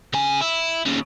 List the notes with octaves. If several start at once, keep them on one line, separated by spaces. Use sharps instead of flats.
C#3 G#5
E4
D#2 C#3